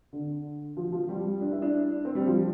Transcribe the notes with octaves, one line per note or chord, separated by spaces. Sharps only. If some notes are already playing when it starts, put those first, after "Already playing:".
D3
F3
F3
G3
D4
E4
D4
C4
G3
F3